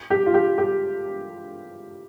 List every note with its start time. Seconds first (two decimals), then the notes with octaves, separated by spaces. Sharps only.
0.10 G4
0.26 F4
0.34 G4
0.58 G4